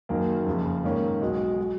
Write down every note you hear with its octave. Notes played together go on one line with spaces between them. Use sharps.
F#1 F#2 D#3 A#3
F#1 F2 C#3
G#2 D#3 A#3 C#4
B1 B2 G#3
F#3